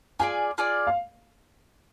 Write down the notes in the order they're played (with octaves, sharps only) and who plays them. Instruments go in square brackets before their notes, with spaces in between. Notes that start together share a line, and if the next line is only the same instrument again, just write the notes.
[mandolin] F4 G#4 D5 [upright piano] G#5
[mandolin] F4 G#4 D5
[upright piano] F5